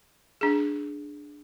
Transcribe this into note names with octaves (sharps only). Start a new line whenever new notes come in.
D4 G#4